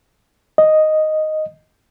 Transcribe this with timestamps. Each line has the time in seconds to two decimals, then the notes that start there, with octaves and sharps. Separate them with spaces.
0.58 D#5